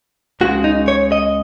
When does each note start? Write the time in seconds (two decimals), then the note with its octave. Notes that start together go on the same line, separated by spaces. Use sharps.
0.41 C#2 C#3 G#3 F#4
0.64 D#4
0.88 C#5
1.12 D#5